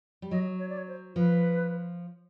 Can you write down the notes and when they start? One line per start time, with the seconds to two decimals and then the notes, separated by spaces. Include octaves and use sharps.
0.22 G3
0.31 F#3 D#5
0.59 C#5
0.69 D5
0.78 C#5
0.88 C5
1.16 F3 B4